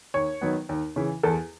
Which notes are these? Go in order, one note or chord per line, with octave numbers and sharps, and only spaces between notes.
D#2 C#5
D#3 F#3 B3
D#2
C#3 E3
E2 A4